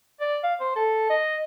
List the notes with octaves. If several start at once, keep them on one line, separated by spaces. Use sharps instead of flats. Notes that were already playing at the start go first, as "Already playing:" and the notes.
D5
F5
C5
A4
D#5